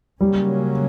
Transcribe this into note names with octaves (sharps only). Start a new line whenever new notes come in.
C#3 F#3 G3 A#3 C#4